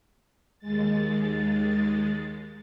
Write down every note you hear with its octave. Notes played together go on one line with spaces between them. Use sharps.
D#2 G#3 A6